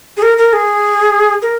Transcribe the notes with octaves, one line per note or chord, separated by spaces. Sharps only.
G#4
A#4
A#4
G#4
A#4